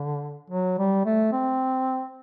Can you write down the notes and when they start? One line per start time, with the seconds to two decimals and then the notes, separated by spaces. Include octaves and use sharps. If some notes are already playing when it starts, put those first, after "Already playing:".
Already playing: D3
0.50 F#3
0.79 G3
1.06 A3
1.32 C4